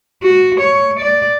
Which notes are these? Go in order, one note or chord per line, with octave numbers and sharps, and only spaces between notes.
F#4
C#5
D5